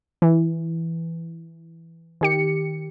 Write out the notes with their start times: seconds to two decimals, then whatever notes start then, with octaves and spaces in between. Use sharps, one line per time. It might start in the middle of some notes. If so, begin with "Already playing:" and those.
0.22 E3
2.21 D#3 G4 C#7